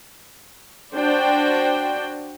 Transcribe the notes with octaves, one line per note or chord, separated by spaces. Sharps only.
D4 F#4 C5 G5